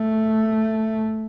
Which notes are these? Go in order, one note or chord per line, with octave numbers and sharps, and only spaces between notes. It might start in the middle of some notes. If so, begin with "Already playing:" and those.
Already playing: A3